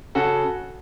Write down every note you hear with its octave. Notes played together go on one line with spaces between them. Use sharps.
C#3 F#4 A4